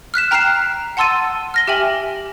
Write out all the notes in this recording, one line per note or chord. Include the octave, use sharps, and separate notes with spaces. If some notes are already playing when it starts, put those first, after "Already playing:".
F6 F#6 B6 E7
G5 A#5 F6 F#6 C7 E7
F#5 A5 C6 E6 A6 D#7
F6 A#6 G7
G4 E5 G5 G#5 F#7